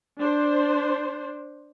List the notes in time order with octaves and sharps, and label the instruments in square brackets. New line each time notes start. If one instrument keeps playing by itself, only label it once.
[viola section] D4 C5